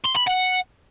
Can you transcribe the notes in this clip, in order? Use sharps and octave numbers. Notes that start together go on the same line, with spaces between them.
C6
B5
F#5